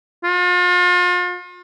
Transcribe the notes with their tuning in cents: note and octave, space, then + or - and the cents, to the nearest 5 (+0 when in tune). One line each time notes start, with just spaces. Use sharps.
F4 +40